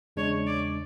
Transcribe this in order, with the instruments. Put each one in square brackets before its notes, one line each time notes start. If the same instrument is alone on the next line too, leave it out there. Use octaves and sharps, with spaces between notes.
[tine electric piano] E2 C#3 G#3 D4 [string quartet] C#5
[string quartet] D5